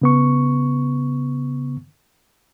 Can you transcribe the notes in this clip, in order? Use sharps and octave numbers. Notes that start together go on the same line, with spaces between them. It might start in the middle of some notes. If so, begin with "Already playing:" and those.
C#3 B3 C#6